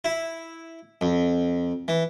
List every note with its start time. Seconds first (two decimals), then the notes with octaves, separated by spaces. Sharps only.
0.05 E4
1.01 F2
1.88 E3